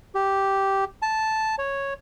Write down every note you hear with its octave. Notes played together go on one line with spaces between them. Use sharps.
G4
A5
C#5